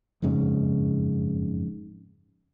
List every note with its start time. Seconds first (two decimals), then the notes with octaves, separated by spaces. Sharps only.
0.22 F#1 F2 G#2 C#3